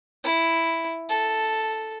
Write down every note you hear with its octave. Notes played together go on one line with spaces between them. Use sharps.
E4
A4